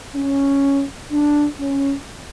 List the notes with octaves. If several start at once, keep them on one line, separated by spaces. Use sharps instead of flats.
C#4
D4
C#4